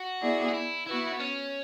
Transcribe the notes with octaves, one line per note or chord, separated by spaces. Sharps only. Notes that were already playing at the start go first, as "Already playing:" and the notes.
Already playing: F#4
B3 E4 G#4 D5
F#4
E4
B3 E4 F#4 B4
B3
C#4